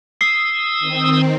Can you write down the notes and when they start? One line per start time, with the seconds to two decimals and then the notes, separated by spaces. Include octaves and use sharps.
0.21 D#6 E6 C7
0.79 D#3 C4